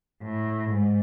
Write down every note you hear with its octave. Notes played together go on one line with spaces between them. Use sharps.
A2
G#2